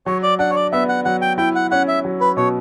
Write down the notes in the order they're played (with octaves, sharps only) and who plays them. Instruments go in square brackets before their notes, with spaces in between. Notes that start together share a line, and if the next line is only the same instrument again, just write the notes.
[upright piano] F#3 [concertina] C#5
[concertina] D5
[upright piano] D4 [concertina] F#5
[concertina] C#5
D5
[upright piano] B3 [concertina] E5
[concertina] F#5
[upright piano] F#3 [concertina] F#5
[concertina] G5
[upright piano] E4 [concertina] G5
[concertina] F#5
[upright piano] C#4 [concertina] F#5
[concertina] E5
[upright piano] F#3
[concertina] B4
[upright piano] B2 [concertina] C#5